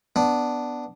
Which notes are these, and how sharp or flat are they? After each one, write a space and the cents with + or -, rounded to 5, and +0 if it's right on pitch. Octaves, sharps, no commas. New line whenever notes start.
B3 +0 D4 +0